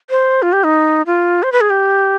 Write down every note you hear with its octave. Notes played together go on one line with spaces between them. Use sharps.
C5
F4
G4
D#4
F4
C5
B4
G#4
G4